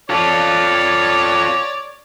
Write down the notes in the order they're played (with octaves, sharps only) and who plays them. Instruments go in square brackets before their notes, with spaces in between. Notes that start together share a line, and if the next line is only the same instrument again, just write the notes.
[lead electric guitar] F4 A4 [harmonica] C#5 D5